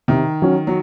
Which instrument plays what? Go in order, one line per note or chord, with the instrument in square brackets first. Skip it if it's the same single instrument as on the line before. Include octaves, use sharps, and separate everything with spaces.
[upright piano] C3 [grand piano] D#3
[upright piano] F#3 C#4 F#4
[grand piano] F#3